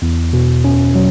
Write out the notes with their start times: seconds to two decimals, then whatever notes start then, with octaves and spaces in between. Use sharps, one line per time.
0.02 E2
0.33 B2
0.64 C#4
0.95 F#3